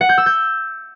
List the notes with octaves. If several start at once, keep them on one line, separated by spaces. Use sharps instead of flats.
F#5
G6
E6
G6